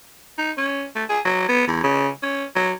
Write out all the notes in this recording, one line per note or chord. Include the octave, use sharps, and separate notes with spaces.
D#4
C#4
A3
G#4
F#3
B3
E2
C#3
C#4
F#3